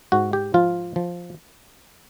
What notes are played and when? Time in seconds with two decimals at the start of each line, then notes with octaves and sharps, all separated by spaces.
0.12 G#2 F#4
0.33 G4
0.54 F3 F4
0.96 F3